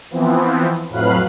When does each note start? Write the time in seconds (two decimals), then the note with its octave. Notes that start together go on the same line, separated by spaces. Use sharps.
0.11 E3 F3 B3 C4
0.89 F2 A2 F#3 B4 F5 F#6